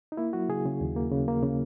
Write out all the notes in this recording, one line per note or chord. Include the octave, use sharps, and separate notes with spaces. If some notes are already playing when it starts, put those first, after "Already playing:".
D#4
A#3 E4
F#3 F#4
C#3 G#4
C#3
D#2
A#3
C#3
A#3
C#3